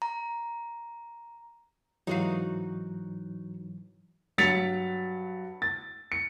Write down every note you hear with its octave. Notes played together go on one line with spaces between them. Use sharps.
A#5
G#2 E3 F#3 D#4 F#4 F5
G2 F#3 A6 B6 C#7 F7
A6
C#7